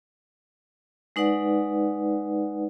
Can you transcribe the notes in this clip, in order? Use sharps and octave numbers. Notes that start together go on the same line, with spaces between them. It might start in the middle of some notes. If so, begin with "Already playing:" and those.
G#3 D#4 B4 D5 F#5